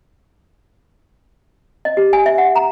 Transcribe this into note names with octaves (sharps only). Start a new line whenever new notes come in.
D#5
G4
G#5
E5
F#5
A#5